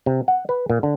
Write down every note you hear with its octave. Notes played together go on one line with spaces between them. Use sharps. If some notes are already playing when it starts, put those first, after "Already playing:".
C3
F#5
B4
A#2
D3